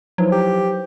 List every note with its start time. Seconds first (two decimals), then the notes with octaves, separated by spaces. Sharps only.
0.18 F3 F#3 D#4 E4 B4 C5
0.32 G4